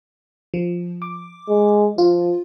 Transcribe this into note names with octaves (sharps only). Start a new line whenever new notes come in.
F3
D6
G#3
F3 F4